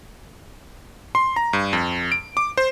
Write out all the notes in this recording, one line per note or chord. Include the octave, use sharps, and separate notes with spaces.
C6
A#5
G2
F2
D7
D6
C5